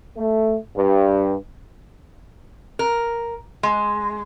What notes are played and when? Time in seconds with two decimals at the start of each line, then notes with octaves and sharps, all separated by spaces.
0.17 A3
0.76 G2
2.79 A#4
3.63 G#3